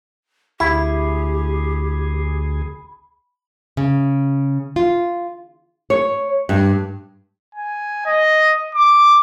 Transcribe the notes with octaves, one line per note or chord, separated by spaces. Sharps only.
D2 E4 G4 G#4 B5
C#3
F4
C#5
G2
G#5
D#5
D6